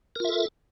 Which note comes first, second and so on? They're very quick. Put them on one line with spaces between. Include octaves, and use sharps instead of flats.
A#4 F4 E5 A4